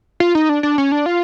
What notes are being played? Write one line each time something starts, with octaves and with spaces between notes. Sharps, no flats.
F4
D#4
D4
D4
C#4
D4
F4